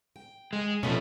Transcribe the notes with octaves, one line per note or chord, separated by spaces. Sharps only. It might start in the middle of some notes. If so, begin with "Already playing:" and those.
G5
G#3
B2 F3 A3 B3 C#4